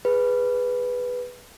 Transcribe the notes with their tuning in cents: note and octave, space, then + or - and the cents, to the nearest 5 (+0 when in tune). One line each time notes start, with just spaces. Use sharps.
G#4 -5 B4 +0